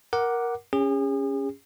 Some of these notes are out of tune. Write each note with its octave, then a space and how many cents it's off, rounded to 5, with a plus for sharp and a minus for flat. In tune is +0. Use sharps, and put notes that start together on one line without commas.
A#4 +10 F#5 +5 D6 +0
C#4 +0 G#4 -40